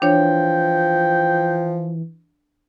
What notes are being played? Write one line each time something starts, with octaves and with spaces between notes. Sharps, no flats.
E3 F3 D4 C#5 G5